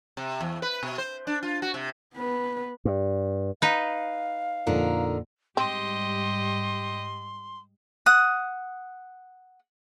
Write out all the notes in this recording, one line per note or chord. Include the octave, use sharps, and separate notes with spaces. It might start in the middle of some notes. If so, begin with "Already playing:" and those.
C3
E2
B4
B2
C5
D4
F4
F#4
C3
B3 B4
G2
D#4 B4 F5
F2 A#2 D3 D#4 A#4
G#2 G3 C4 G4 D#5 C6
F#5 D#6